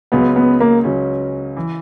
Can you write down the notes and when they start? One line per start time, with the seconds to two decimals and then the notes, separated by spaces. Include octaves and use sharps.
0.12 C#2 C#3 F#3 B3 C#4
0.36 B3
0.60 A#3
0.84 C#2 C#3 F#3 C#4
1.57 E3